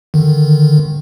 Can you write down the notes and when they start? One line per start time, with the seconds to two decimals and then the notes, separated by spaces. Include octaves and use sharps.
0.14 D3 D#3